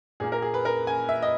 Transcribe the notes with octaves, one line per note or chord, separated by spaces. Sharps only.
A#2 A#3 G#4
A#4
G#4
B4
A#4
G#5
E5
D#5